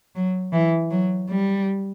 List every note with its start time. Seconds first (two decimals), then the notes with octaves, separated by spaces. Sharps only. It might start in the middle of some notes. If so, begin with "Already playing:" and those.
0.15 F#3
0.53 E3
0.91 F#3
1.29 G3